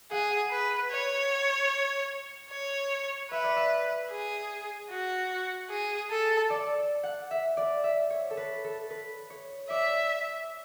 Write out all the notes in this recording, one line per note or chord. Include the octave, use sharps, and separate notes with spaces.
G#4 F#5
B4
C#5
C#5
B4 E5
D5
E5
G#4
F#4
G#4
A4
D5
F#5
E5
D5
E5
C#5
A4
B4
A4
B4
C#5
D5 E5